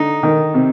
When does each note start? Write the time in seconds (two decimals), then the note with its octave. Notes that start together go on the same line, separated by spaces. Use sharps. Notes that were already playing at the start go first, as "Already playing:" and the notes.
Already playing: D3 D#4
0.23 D#3
0.54 C3